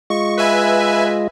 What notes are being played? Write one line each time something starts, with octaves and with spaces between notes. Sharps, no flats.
G#3 F4 D#5 C#6
B4 E5 G#5